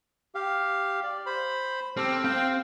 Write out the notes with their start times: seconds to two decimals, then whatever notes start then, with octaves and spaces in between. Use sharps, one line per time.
0.35 G4 F5
1.04 D5
1.26 C5 B5
1.97 C4 G4 A4 F6
2.24 C4 F5 G5